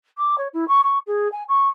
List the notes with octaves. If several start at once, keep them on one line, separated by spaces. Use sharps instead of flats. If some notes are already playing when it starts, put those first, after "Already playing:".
D6
C#5
E4
C#6
C#6
G#4
G#5
C#6